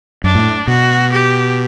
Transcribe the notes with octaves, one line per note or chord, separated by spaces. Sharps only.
F#2 D4
A2
B2 F#4
G4